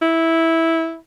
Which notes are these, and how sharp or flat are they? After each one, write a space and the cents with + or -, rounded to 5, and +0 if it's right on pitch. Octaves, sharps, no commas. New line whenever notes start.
E4 -10